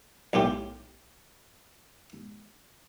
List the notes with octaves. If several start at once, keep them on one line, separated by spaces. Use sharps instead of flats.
B1 A2 F4 G4